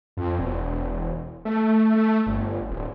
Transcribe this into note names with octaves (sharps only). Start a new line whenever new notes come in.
F2
E1
A3
A3
G1
D1